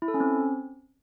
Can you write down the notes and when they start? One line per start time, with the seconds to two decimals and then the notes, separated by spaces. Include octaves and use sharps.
0.02 E4
0.08 A4
0.14 C#4
0.20 C4